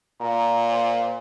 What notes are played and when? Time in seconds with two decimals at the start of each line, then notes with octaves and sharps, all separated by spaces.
0.21 A#2 A#5
0.71 C5